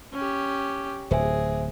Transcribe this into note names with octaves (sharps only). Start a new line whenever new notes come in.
C#4 G4
D1 G#4 C5 E5 G#5